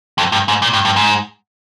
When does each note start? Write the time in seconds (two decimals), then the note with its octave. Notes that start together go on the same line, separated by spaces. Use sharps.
0.18 F2
0.32 G2
0.48 G#2
0.62 A#2
0.73 G2
0.85 G2
0.96 G#2